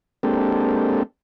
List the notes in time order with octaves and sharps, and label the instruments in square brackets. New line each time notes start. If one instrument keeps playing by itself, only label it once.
[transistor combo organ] G#3 A#3 C4 D4 G4 A4